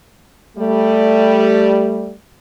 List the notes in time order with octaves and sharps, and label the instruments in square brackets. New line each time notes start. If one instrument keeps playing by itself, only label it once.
[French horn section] G3 A3